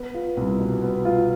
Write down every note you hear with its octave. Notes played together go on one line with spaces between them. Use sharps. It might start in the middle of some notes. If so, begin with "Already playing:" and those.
Already playing: B3
F4
C2
B2
B3
F4